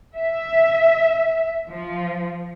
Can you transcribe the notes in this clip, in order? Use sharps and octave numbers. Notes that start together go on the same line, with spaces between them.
E5
F3